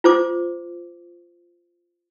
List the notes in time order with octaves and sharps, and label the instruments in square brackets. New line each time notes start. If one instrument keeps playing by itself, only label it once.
[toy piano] F4 C5 D6